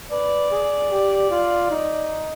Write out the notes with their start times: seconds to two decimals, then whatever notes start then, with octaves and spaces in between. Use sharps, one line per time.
0.11 B4 D5
0.51 G#4
0.91 G4
1.30 F4
1.70 D#4